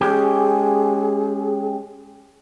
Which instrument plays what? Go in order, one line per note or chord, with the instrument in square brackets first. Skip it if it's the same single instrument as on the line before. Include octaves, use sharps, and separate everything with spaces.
[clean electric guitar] G#3 C#4 G4 [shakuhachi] G#4